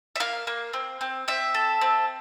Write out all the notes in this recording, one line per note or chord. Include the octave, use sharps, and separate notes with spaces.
E5
A#3 F5
A#3
C4
C4
C4 E5
A4
C4